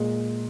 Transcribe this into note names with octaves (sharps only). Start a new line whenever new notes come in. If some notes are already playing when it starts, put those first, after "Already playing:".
Already playing: A#2 G#3